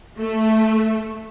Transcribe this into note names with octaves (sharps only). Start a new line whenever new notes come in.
A3